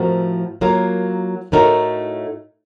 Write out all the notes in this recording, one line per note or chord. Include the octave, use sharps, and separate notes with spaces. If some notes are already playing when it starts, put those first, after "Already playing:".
Already playing: A2 F3 C4 F#4 A#4
F#3 A#3 F4 A#4
A2 A3 D#4 F#4 A#4